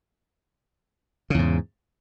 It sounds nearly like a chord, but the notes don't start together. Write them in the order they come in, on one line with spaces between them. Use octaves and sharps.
C#3 E2 G#2